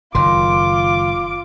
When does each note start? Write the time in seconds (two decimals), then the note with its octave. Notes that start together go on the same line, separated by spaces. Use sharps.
0.15 F#1 D#3 F4 C6 D6